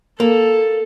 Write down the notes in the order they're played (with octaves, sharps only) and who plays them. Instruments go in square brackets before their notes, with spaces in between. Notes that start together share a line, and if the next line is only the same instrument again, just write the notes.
[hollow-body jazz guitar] A#3 [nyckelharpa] A4